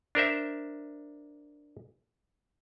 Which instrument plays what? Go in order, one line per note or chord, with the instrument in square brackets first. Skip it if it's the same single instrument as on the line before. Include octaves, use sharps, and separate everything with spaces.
[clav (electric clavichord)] D4 A#4 C5 E5